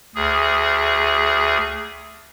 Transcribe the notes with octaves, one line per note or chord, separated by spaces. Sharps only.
D2 G#4